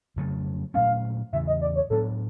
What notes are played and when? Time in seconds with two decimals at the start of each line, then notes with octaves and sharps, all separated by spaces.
0.16 F2 C#3 F#3 A3
0.74 A#2 F#3 A3 C#4 F5
1.33 E2 C#3 E3 E5
1.47 D#5
1.61 D5
1.76 C#5
1.90 A2 F#3 B3 D4 A4